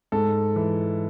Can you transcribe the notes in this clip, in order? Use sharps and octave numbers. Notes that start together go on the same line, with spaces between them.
G#2 A4
E3